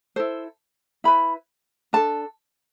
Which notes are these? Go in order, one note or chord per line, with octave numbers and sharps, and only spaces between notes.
E4 A4 C5
E4 B4 B5
D4 A4 A5